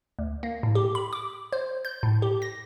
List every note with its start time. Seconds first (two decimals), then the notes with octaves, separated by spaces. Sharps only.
0.19 D2
0.43 A#3
0.63 A2
0.75 G4
0.95 B5
1.13 D6
1.53 C5
1.85 G6
2.03 A2
2.22 G4
2.42 A#6